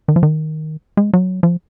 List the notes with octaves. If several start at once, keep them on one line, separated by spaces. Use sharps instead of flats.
D#3
F3
D#3
G#3
F#3
F3